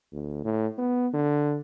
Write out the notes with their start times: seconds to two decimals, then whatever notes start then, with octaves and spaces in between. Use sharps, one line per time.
0.12 D2
0.44 A2
0.78 B3
1.14 D3